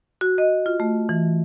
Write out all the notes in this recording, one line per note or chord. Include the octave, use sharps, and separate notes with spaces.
F#4
D#5
F4
A3
E3